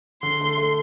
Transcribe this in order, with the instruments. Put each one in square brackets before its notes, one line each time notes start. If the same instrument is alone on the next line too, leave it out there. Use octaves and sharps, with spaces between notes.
[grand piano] D3 [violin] C6
[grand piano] A3
A3